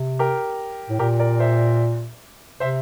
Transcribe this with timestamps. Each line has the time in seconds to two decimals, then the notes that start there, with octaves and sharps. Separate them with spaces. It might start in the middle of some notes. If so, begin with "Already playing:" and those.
Already playing: C3
0.19 G4 A#4
0.90 A2
0.99 A#2 G4 A#4
1.19 A#4 D5
1.40 C5 E5
2.60 C3 C5 E5